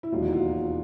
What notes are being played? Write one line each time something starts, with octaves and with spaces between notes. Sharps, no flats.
E4
E1 D#2 D#3 F#3 F4
F#4
F4